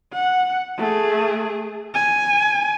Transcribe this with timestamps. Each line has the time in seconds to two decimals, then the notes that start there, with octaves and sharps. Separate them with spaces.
0.13 F#5
0.78 A3 G#4
1.95 G#5